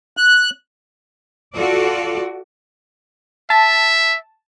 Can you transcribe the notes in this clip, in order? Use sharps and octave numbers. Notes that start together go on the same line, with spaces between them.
F#6
F4 F#4 A4 D5
E5 A5